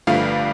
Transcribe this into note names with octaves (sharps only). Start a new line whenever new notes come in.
G1 G2 F3 A3 F5